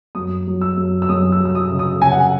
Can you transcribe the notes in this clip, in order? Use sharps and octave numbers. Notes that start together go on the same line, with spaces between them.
F#2 D#6
F#3
E6
F#2
E6
F#2 D#6
E6
F#3
E6
D#6
C#3
D#6
C#3 G#5
F#5
G#5